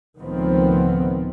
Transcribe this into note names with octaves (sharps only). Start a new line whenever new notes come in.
C#2 A2 D#3 F3 B3 C4